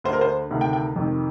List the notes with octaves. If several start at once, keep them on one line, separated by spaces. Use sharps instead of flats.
D2 D3 A#4 C5
C5
D2 C3 D#3
G5
G5
F2 C3 D#3